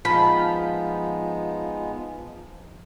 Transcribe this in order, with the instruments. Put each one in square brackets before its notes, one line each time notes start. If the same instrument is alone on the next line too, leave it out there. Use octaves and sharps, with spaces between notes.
[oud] F3 [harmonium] G#3 B3 D#4 [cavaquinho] B5